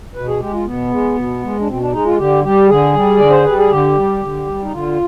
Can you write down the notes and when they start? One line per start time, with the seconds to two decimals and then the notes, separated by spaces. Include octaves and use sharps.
0.15 B2 B4
0.28 G#4
0.40 G#3 G4
0.54 F4
0.65 B2 B3
0.91 G#3
1.17 B2
1.42 G#3
1.60 D4
1.67 B2 C4
1.80 D4
1.92 G#3 D#4
2.05 F4
2.18 D3 G4
2.44 G3 G4
2.69 D3 G#4
2.94 G3
3.17 D3 D5
3.30 C5
3.44 G3 B4
3.58 G#4
3.70 D3 G4
3.96 G3
4.22 D3
4.47 G3
4.63 D#4
4.72 D3 F4